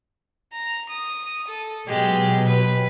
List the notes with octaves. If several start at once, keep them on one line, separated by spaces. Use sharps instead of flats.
A#5
D#6
A4
B2 F#3 G#3 G4
B4